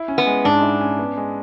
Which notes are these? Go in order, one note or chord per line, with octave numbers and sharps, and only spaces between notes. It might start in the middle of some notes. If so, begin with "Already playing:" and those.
Already playing: E4
C#4
B3
G#3
G#2 D4
E4
C#4
B3
G#3